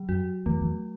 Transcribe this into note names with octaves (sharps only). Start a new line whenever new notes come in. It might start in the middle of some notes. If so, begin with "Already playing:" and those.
Already playing: F#3
F#2 F#4
E2 A3
E2